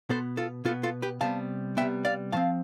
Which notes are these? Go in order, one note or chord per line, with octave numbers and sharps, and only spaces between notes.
B2 B3 A4 C5
F4 A4
B2 B3 F4 A4
F4 A4
G4 B4
C3 G3 B3 F5 A5
C3 G3 B3 E5 G5
D5 F5
A2 F3 C4 F5 A5